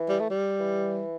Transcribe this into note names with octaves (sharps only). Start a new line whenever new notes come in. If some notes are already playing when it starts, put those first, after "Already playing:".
Already playing: E3
G3
A3
G3
E3